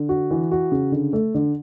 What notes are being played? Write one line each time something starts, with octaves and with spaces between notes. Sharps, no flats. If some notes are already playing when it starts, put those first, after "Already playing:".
Already playing: D3
F#4
E3
F#4
C#3
D3
A3
D3